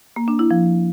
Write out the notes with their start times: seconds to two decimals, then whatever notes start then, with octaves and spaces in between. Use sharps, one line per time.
0.16 A#3
0.28 D4
0.39 E4
0.51 F3